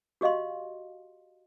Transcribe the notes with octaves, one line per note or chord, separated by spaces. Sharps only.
F#4 G4 D#5 F5 C6